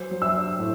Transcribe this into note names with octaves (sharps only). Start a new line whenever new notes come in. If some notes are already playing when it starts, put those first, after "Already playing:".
Already playing: F#3 C5
F#3
E5 E6
D4
A2